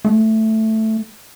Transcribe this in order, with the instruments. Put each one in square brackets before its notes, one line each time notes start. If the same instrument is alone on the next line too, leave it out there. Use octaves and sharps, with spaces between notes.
[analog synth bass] A3